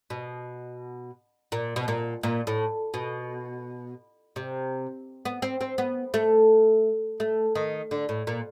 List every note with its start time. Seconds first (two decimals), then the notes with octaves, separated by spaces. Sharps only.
0.10 B2
1.52 A#2
1.76 B2
1.88 A#2
2.23 A#2
2.47 A2
2.94 B2
4.36 C3
5.25 B3
5.42 C4
5.61 C4
5.78 B3
6.14 A3
7.20 A3
7.55 D#3
7.91 D3
8.09 A2
8.27 A#2